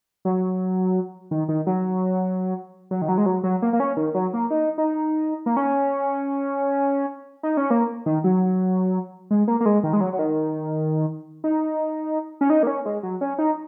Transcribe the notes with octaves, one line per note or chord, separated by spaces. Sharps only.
F#3
D#3
D#3
F#3
F#3
D#3
F#3
G#3
F#3
F#3
A#3
A#3
C#4
D#3
F#3
A#3
D#4
D#4
A#3
C#4
D#4
C#4
A#3
D#3
F#3
G#3
A#3
A#3
G#3
D#3
G#3
F#3
F#3
D#3
D#4
C#4
D#4
A#3
C#4
G#3
F#3
C#4
D#4